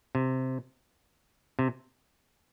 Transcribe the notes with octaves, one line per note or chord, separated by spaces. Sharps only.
C3
C3